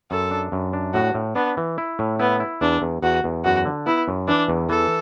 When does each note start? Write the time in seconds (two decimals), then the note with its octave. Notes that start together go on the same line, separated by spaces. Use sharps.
0.11 F#2 A4
0.31 D4
0.52 F#2
0.73 D4
0.94 A2 F#4
1.14 A2
1.35 B3 D4
1.57 E3
1.78 E4
1.99 A2
2.19 B3 E4
2.40 E4
2.61 E2 D4
2.82 E2
3.02 E2 F#4
3.24 E2
3.45 F#2 F#4
3.65 D3
3.86 B3 E4
4.08 F#2
4.28 E3 D4
4.48 E2
4.69 E3 A4